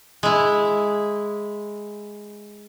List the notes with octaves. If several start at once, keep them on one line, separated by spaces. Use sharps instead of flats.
G#3 E4